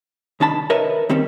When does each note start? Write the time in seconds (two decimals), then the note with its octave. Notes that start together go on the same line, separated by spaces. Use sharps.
0.40 C2 D#3 D4 A5 B5
0.70 A#4 B4 C#5 D#5 E5
1.09 D#3 G3 C4 C#4